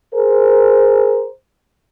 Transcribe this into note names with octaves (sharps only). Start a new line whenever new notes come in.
G#4 A#4 C5